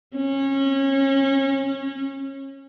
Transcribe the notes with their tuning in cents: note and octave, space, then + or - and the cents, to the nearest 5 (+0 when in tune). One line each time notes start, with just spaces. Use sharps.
C#4 -25